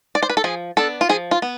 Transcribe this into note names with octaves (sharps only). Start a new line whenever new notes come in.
D5
C5
B4
A4
F3 G#4
B3 D4 A4
F4
F3 G#4
F4
B3